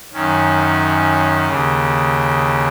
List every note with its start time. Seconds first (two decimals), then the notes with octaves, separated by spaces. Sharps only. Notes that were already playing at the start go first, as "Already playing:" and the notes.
0.13 F#2 D#3 C#4
1.46 D#2 C#3